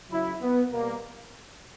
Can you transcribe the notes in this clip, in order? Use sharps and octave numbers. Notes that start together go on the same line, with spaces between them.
C#3 F#3 E4
B3
B2 G3 A#3